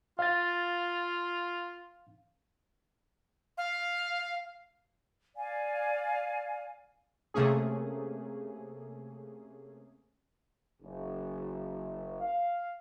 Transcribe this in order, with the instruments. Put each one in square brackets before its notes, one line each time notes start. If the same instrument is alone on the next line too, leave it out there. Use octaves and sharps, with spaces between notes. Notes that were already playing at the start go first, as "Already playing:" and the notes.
[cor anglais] F4 [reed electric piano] F5 A6
[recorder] F5
[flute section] D5 F5 G#5
[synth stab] C3 A3 A#3 C#4 G#4
[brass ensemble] F#1
F5